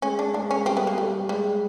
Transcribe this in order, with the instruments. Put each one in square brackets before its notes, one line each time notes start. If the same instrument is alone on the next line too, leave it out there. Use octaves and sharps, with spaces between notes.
[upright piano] G#3 [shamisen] C#4
[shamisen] D4
[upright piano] G#3 [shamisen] D4
[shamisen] C#4
[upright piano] G3 [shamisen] C4
[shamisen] B3
A#3
[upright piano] G3 [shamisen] A3
[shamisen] G3 [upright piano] G#3